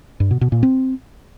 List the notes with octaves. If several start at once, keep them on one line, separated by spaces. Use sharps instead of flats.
G2
B2
B2
A#2
C4